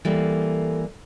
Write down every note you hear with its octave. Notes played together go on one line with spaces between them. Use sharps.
E3 G3 A#3 A4